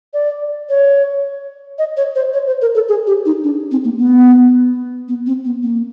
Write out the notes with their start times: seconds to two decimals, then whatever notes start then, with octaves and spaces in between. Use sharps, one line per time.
0.14 D5
0.69 C#5
1.79 D#5
1.97 C#5
2.15 C5
2.34 C#5
2.47 C5
2.61 A#4
2.75 A4
2.89 G#4
3.07 G4
3.26 D#4
3.44 D4
3.71 C4
3.84 A#3
3.99 B3
5.08 B3
5.27 C4
5.45 B3
5.63 A#3